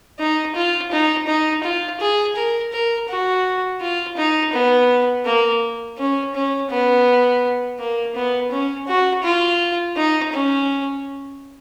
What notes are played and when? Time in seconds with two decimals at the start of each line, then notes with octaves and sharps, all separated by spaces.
0.19 D#4
0.55 F4
0.91 D#4
1.27 D#4
1.63 F4
2.00 G#4
2.35 A#4
2.72 A#4
3.09 F#4
3.81 F4
4.17 D#4
4.53 B3
5.25 A#3
5.97 C#4
6.34 C#4
6.70 B3
7.79 A#3
8.15 B3
8.51 C#4
8.87 F#4
9.23 F4
9.96 D#4
10.33 C#4